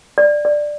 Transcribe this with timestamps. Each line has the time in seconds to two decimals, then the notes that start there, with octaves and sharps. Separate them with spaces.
0.18 D5
0.45 D5